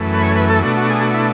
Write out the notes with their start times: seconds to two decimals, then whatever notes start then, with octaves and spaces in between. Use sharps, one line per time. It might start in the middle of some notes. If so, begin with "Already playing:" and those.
Already playing: F#2 E3 A3
0.14 B4
0.22 C#5
0.36 B4
0.50 A4
0.62 B2 A3 D4 F#4
0.77 F#4
0.90 G#4
1.02 F#4
1.14 E4